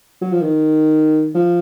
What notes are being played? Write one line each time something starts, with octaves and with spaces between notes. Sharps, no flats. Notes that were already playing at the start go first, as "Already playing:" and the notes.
F#3
F3
D#3
F3